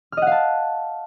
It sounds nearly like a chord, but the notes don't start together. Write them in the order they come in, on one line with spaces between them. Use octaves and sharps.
F6 D#5 F#5 F5 A5